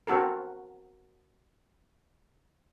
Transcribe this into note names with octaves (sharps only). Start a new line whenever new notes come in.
C4 F#4 A4 A#4